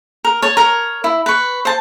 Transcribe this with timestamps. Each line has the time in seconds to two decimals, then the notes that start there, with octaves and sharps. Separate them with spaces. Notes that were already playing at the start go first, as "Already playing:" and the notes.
0.25 A#4
0.42 C#5 A5
0.57 A#4 C#5
1.04 E4
1.26 B4 C#6
1.65 C5 A5